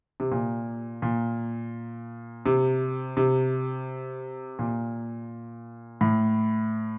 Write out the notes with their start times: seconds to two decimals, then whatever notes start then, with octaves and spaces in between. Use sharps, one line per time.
0.20 C3
0.32 A#2
1.02 A#2
2.46 C3
3.17 C3
4.59 A#2
6.01 A2